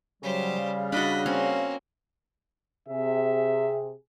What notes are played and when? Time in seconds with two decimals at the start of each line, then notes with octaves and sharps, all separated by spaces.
0.23 C#3 F#3 G3 G4 C5
0.59 F5
0.92 D4 F#4 D#5 B5
1.26 A#3 C4 C#4
2.88 C3 G#4 E5